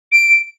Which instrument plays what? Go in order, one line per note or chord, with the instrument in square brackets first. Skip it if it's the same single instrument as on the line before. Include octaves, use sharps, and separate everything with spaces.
[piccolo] D7